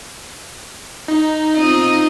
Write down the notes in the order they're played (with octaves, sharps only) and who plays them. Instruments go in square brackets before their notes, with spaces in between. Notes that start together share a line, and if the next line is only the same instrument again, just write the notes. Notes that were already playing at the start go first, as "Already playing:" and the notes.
[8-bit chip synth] D#4
[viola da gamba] C4 F4 D#5